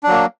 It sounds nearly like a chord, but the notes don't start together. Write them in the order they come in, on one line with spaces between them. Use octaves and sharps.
D4 F#3 A#3